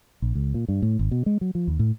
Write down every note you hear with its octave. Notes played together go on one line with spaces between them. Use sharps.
A#1
C#2
A#2
G2
A2
G#1
B2
G#3
F#3
F3
D#2
A2